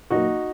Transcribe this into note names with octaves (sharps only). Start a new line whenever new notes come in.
A#2 F#3 A#3 D#4 F#4